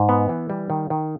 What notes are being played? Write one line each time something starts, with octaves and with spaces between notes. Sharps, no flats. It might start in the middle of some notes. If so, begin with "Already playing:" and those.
Already playing: G#2
B3
E3
G3
D#3
D#3